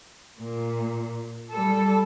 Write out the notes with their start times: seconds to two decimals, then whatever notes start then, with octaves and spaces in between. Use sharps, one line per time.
0.40 A#2
1.51 G3 A4